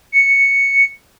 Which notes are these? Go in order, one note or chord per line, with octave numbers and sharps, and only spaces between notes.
C#7